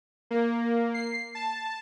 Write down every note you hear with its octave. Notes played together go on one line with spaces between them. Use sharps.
A#3
C7
A5